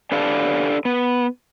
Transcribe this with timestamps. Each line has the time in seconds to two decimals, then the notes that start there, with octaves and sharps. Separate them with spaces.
0.12 D4 G4 A4 B4 D5 F5
0.85 B3